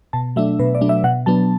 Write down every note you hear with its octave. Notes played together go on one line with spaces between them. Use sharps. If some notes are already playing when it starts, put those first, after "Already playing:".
B2 A5
F#3 A3 D4 E5
B2 B4
D5
F#3 A3 D4
E5
B2 F#5
F#3 B3 D4 A5